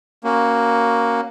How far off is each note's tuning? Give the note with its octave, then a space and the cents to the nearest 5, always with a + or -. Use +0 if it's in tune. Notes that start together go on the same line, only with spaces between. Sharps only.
A#3 +5 C#4 +0 F#4 +0